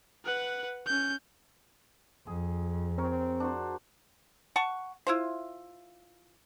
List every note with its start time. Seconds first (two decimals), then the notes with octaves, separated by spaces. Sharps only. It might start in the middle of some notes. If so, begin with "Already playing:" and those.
0.24 B4 F#5
0.87 C#4 G6
2.27 F2 G#4
2.98 C4 A#4 C#5
3.40 D4 F#4 C5
4.56 F#5 A5 C#6
5.07 E4 F4 C5